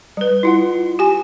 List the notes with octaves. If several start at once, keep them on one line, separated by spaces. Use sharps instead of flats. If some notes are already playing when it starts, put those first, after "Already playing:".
G3 B4
E4 F4 F#5
G4 G#5